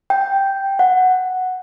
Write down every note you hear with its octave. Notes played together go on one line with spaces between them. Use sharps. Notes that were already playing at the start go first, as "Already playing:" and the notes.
G5
F#5